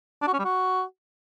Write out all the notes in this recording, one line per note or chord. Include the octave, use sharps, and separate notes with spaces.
D4
F#4
C#4
G3
F#4